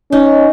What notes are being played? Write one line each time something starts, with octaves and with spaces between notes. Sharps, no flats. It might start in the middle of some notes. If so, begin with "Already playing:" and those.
C#4 D#4